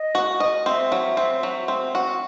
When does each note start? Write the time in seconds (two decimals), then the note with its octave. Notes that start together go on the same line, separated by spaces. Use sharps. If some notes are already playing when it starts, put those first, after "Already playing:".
Already playing: D#5
0.15 F#4
0.40 D#5
0.66 C4 E5
0.92 F#3
1.17 C4
1.43 F#3
1.68 C4
1.95 F#4